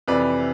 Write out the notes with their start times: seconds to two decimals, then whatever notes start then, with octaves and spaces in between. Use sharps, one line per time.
0.08 F2 C3 E3 B4 D5